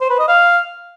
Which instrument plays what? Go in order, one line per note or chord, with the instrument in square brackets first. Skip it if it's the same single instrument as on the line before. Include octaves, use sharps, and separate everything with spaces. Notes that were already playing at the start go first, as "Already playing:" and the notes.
[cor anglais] C5
B4
D#5
F5